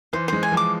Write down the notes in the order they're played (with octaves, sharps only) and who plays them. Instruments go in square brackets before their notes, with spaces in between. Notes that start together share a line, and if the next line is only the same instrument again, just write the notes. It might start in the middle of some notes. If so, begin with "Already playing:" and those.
[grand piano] E3 [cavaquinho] C5
[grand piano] G#3 [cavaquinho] C5
[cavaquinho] G#5
[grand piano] F3
[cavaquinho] D6